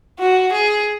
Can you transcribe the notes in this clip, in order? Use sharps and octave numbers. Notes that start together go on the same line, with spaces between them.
F#4
G#4